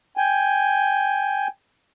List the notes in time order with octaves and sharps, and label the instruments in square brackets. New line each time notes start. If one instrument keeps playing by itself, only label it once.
[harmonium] G5 G#5